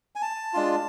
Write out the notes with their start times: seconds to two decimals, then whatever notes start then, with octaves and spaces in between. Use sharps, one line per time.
0.16 G#5
0.22 A5
0.53 G#3 D4 F4